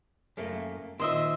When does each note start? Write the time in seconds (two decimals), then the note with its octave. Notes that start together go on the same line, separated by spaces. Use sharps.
0.37 F#2 A3 A#3
0.99 A#2 D#3 C5 D#5 E5